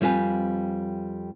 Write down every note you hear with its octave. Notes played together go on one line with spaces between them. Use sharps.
F2 G3 C4 F4 B4 G#5